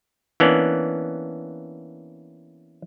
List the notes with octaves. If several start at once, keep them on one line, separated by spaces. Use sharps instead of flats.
E3 A#3 B3 C#4 D4